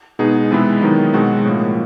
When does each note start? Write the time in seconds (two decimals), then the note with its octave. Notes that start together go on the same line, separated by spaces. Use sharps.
0.19 B2 G#3 B3 D#4 G#4
0.51 C3 E3 G#3 B3 E4
0.82 D#3 F#3 B3 D#4
1.13 B2 G#3 C4 D#4 F#4
1.45 A2 F3 A#3